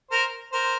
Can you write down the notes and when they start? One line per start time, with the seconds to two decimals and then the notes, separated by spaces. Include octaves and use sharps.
0.11 A#4 C5
0.52 A#4 C5